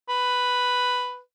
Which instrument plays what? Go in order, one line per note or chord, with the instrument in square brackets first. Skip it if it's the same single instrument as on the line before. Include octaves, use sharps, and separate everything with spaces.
[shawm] B4